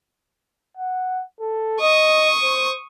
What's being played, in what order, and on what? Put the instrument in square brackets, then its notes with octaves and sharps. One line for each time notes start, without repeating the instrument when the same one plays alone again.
[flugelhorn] F#5
A4
[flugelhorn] D#5 [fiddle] C#6 D#6
[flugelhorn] C5